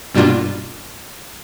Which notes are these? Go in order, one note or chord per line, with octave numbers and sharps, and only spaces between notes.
G2 B2 G3 A#3 D4 F4